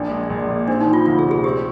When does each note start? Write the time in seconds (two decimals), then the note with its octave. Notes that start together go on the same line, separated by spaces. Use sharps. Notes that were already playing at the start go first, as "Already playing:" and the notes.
Already playing: A#1 D4
0.10 G#3
0.30 A#1
0.49 A#2
0.68 C4 D4
0.80 D#4
0.87 F3
0.93 F4
1.06 D2 F4
1.19 G#4
1.25 C3
1.31 G#4
1.44 C4 G4